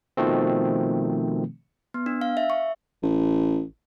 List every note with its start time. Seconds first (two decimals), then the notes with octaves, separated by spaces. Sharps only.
0.17 B2 D#3 F3 A3 C4
1.94 B3
2.06 D4
2.21 F5
2.37 E5
2.50 C#6
3.03 A1